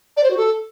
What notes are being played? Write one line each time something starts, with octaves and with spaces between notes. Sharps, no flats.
D5
C5
F#4
A4